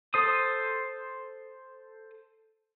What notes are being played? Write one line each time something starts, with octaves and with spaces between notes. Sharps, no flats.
A4 C5 D#6